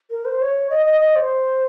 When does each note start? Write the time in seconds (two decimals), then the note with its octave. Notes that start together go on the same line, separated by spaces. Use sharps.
0.10 A#4
0.25 C5
0.41 C#5
0.70 D#5
0.86 D#5
1.01 D#5
1.16 C5